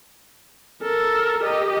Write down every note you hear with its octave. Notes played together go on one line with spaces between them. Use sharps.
A4 A#4
G4 D#5